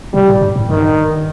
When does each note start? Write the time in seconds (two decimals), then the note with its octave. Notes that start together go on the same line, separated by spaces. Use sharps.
0.14 C3 G3
0.28 A2
0.41 G2
0.56 A2
0.70 G2 D#3